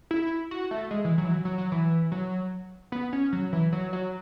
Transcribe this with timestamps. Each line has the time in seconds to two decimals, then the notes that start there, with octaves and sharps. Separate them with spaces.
0.11 E4
0.51 F#4
0.71 A3
0.91 G#3
1.05 E3
1.18 F#3
1.25 E3
1.32 F#3
1.45 F#3
1.58 F#3
1.72 E3
2.12 F#3
2.92 B3
3.13 C#4
3.33 F#3
3.53 E3
3.73 F#3
3.93 F#3